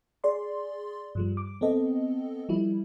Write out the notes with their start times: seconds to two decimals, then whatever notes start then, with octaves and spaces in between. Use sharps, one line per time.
0.24 G#4 D5 C6
1.15 G2 F3 G3
1.37 D6
1.61 B3 C4 A4 D#5
2.49 F3 G3 E4